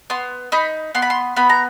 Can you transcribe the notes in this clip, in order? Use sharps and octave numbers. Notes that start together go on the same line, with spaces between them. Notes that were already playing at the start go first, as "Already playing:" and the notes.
B3 C6
D#4 B5
B3 C6
B5
C6
B3 B5
A#5